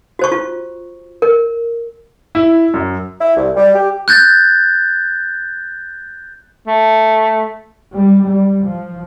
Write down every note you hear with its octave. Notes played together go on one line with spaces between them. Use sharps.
F#4 C5 C#6
F4
A#4
E4
F#2
E4
C2
G3
G4
F#6 G6 A6
A3
G3
G3
F3